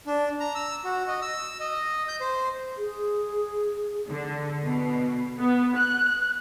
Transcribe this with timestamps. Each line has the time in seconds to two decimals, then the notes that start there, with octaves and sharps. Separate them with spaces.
0.06 D4
0.40 A#5
0.55 E6
0.84 F#4
1.08 D#5
1.22 E6
1.60 D#5
2.08 G6
2.20 C5
2.77 G#4
4.09 D3
4.64 B2
5.39 B3
5.76 F#6